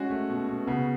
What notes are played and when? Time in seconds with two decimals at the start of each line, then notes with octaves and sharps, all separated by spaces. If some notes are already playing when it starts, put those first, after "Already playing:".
Already playing: G#3 C#4 F#4
0.10 A3
0.30 B2
0.49 B2
0.67 C#3 B3